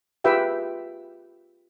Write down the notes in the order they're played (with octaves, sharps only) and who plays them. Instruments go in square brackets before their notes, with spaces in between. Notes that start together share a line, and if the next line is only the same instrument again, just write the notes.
[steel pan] F4 G4 G#4 B4 E5 G5